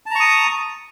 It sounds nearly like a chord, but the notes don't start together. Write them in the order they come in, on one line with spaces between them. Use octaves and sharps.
A5 A#5 C#6 D#6